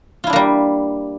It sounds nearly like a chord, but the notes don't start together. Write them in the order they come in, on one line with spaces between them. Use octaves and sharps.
F4 E4 D4 A#3 G3